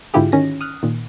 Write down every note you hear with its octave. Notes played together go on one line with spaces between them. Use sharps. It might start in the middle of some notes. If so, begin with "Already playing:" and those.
G#2 D3 E4 F4 G4 G#4
D#3 C#4 A#6
D#6 F6 F#6
A#2 D#3